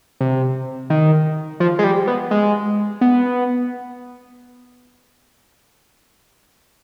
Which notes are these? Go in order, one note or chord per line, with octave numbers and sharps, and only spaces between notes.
C3
D#3
F3
G#3
G3
B3
G#3
B3